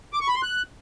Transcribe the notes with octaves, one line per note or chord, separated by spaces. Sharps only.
D6
C#6
B5
C6
F#6